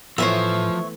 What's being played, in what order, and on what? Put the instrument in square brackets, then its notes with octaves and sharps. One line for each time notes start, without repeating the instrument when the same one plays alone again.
[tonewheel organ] A2 [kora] E3 A3 B3 [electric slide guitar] F3 [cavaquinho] C5 C#5 E5